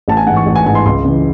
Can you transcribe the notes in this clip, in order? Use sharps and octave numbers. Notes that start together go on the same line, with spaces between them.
A1 A5
G#5
G#2 E3 F#5
C#6
A1
G#5
G#2 E3 G#5
C6
C#2 C6
C#3 E3